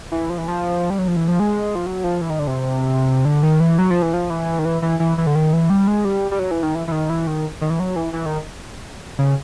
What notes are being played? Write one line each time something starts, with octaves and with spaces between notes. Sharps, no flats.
E3
F3
E3
F3
G3
F#3
F3
E3
F3
G#3
F3
F#3
F3
E3
D#3
D3
C3
D3
D#3
E3
F#3
F3
E3
F3
E3
D#3
E3
E3
E3
E3
D3
D#3
E3
G3
G#3
G3
G3
F#3
E3
D#3
E3
E3
D#3
E3
D#3
D#3
E3
F#3
E3
E3
D#3
C#3